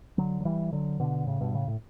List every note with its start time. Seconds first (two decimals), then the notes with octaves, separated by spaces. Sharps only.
0.18 D3 F#3
0.41 F#3
0.45 E3 G3
0.73 D3 F#3
1.00 B2 D3
1.27 A2 C#3
1.40 G2 B2
1.55 A2 C#3
1.68 A2